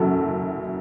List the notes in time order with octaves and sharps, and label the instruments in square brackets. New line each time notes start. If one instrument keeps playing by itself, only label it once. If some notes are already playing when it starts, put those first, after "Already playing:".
Already playing: [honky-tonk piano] F#1 F#2 F#3 [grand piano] F#4 A4